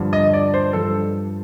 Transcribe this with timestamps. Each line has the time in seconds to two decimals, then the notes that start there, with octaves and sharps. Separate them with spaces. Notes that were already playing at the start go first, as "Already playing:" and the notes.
Already playing: G2 D3 F3
0.13 D#5
0.33 D5
0.54 C5
0.73 G2 F3 A4